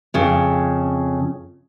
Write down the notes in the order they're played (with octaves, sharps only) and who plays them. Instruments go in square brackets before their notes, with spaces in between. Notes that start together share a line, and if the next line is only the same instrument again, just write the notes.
[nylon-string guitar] F2 C#3